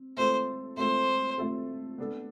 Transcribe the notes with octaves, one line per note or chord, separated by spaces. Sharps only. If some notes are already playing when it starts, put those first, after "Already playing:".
Already playing: C4
A3 C4 F4 A4 C5
A3 C4 F4 A4 C5
A3 C4 F4 A4
B3 D4 A4